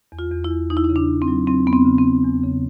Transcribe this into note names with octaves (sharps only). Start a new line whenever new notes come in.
E2
F4
E2
E4
E2
E2 D#4
E4
D#4
C#3
D4
C#3
C4
F#3
F#3 C4
E2 B3
C4
C#3
C4
E2
E2
C#3